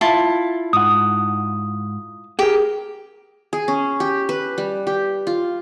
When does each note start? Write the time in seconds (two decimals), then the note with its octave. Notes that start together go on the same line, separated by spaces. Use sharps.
0.01 E4 F4 A5
0.73 G#2 F#5 D#6
2.39 G4 G#4 A#4 G5
3.53 G#4
3.68 C#4
4.00 G4
4.29 B4
4.58 G3
4.87 G4
5.27 F4